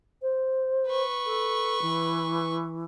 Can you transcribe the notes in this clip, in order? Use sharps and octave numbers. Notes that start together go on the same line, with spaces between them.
C5
B4 C#6
A4
E3